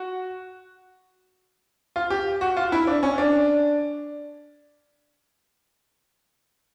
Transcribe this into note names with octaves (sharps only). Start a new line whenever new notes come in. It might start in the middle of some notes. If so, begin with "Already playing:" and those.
Already playing: F#4
F4
G4
F#4
F4
E4
D4
C#4
D4